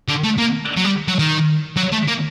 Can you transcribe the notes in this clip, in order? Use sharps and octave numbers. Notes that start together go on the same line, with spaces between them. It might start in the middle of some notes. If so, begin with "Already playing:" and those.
D3
A3
A#3
F#3
G3
F#3
D#3
F#3
A3
A#3